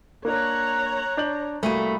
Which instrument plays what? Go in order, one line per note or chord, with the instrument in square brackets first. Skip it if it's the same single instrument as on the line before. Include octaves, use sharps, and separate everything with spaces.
[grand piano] A#3 D4 [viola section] C#5 A#5 [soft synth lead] F#6
[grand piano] D4 G6 F#7
[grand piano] C2 D#7 [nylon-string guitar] A3 A#3 F#4 [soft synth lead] B5